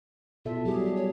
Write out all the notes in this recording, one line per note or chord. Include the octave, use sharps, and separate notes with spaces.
B2 F4 A4 E5
F#3 G3 G4 G#4
C#5